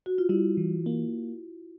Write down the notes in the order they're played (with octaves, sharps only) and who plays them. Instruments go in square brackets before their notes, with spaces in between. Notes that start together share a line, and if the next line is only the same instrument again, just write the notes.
[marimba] F#4
F4
[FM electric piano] G3 [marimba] E4
[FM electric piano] E3
A#3